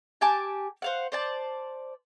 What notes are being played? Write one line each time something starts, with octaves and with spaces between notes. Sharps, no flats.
G4 G#5 A5 D6
C5 F5 F#5
C5 D5 A5